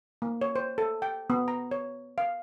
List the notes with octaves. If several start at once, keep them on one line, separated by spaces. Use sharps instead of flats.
A#3
C#5
C5
A4
G5
B3
A#5
C#5
F5